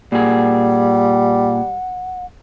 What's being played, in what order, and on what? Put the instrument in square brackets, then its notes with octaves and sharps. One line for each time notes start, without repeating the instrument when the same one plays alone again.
[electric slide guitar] A#2 G#4 [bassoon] G3 [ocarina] F#5